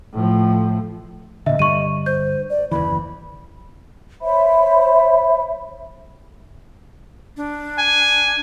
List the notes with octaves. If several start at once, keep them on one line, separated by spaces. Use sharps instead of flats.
A2 F3
A#2 D3 D#5 E5
G2 D3 G3 C#6 D#7
C5 G6
D5
F#1 D#2 E3 B5
C5 C#5 E5 B5
D4
G#5